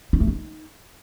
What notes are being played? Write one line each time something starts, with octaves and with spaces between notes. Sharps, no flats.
D#4
A3
D#4